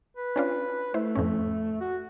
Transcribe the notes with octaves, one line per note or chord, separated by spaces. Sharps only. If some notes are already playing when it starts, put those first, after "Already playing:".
B4
C#4 D4 F4
A3 E4 C5
F2 A2 C#4
F#4